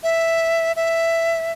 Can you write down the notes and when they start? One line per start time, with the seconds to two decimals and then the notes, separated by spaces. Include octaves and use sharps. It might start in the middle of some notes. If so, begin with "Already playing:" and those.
0.03 E5
0.76 E5